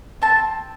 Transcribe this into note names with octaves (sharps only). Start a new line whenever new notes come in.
C4 A5